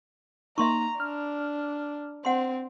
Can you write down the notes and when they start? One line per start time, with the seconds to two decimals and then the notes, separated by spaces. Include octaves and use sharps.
0.58 A#3 D#4 E5 A#5 C6 C#6
1.00 D4 F6
2.25 C4 F#5 C6